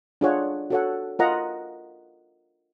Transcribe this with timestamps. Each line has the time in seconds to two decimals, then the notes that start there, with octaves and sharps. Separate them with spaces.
0.21 D4 F4 G#4 C#5 F#5
0.70 F#4 A4 C#5 F#5
1.19 F4 A#4 D#5 F#5 A#5